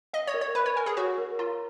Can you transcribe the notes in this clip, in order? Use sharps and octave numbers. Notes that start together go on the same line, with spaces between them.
D#5 F5
C#5
A#4
C#5
B4 B5
C#5
A#4 G#5
G#4
F#4 C#5
A#4
F4 A#5